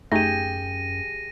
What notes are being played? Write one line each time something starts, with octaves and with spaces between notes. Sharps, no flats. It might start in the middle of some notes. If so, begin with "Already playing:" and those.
F#2 A3 D#4 G4 G#4 A#6 D#7